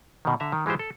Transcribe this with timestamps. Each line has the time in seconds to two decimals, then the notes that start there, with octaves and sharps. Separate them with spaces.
0.25 B2 D#3
0.40 D3 E5 A#5
0.52 D#3
0.66 E3 G#3 F4 G4 C5
0.79 A4